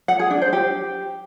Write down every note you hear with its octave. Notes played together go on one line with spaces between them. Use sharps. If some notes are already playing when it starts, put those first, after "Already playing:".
F#5
G#4
D4
C5
G4